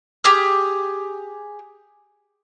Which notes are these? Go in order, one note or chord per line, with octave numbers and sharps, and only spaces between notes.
G4 G#4 F6